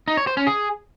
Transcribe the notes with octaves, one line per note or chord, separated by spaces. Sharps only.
D#4
C#5
C5
C#4
G#4